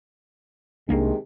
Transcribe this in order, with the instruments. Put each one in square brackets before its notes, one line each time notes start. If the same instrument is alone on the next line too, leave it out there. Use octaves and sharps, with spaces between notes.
[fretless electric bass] C2 A#3 D4 [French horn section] C3 D#3 G#3